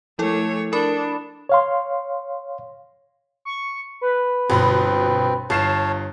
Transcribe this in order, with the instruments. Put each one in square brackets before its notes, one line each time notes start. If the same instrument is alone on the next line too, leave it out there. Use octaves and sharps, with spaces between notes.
[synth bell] F3 E4 A4 [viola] A3 C#5
[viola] D4 [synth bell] A#4 B5
[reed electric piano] C#5 F5 C6
[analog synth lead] C#6
B4
[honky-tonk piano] G1 B2 B5 [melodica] C4
[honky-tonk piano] G1 C7 E7 [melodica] C#5 F5 A5